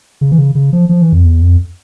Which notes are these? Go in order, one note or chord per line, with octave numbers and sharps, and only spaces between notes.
C#3
E3
C#3
C#3
F3
F3
E3
F2
E2
F2